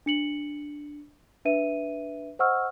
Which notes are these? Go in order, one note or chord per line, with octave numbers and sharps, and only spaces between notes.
D4 C#7 F#7
D4 B4 E5 D#7
C5 D#5 F#5 C#6 E6 F6